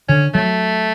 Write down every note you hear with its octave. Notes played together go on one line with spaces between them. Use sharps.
D3 C#4
F#3 A3